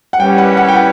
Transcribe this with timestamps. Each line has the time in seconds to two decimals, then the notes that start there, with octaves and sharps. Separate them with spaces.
0.13 F#5
0.19 G3 C#4 E4 B4 G5
0.38 F#5
0.57 F#5
0.68 G5
0.75 F#5